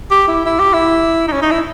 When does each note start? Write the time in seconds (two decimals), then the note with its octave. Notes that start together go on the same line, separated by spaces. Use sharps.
0.11 G4
0.28 E4
0.46 E4
0.59 G4
0.73 E4
1.28 D#4
1.32 C#4
1.42 D#4
1.51 E4